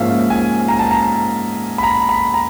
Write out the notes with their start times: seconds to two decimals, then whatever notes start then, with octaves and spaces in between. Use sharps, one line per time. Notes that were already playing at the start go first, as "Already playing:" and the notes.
Already playing: G#2 F3 A#3 C#4 E5 F5
0.30 G#5
0.69 A#5
0.79 A5
0.91 A#5
1.78 B5
1.83 A#5
2.09 B5
2.34 A#5